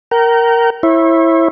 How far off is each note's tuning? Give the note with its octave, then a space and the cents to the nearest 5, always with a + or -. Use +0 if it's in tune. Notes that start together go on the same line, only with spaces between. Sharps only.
A#4 +0 G5 -40
E4 +0 C#5 -40